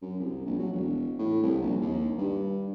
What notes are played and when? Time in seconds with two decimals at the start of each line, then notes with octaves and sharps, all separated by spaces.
0.02 F#2
0.20 C2
0.46 A#1
0.59 F#3
0.73 E1
1.18 A2
1.43 C2
1.62 A#1
1.82 D#2
2.18 G2